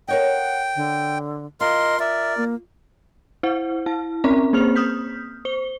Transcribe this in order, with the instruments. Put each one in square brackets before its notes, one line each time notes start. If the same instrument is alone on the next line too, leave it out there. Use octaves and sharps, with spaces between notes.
[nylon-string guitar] A#4 C#5 D#5 [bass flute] F#5 [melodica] G5
[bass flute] D3
[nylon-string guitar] F4 [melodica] A#4 C6 [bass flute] D#5
[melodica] A#4 D5 [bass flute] E5
[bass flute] A#3
[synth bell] E4 C5 F#5
E4 A5
C4 C#4 A#4 E5 A#5
A#3 C4 G#4 C5 F6 F7
D#6 F6 G6 B6
C5 G7